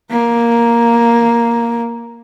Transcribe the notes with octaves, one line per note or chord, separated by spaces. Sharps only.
A#3